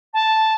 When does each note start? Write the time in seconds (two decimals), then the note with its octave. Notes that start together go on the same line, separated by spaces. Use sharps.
0.13 A5